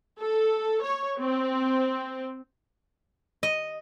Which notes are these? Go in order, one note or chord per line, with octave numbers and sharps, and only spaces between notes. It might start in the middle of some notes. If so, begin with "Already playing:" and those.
A4
C#5
C4
D#5